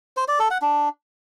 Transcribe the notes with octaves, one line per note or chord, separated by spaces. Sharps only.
C5
D5
A4
F#5
D4